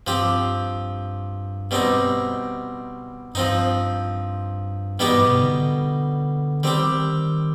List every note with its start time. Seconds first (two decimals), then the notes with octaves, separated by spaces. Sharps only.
0.07 G2 F3 C4 G4
1.71 B2 G3 C4 D#4
3.34 G2 F3 C4 D#4
4.99 G#2 B2 G3 B3 D#4 G4
5.29 C3
5.40 D3
6.63 D#3 G3 C4 G4